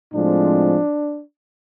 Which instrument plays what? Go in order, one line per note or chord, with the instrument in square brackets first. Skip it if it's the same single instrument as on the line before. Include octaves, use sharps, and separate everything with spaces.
[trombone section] A2 F3 G#3 C4 D4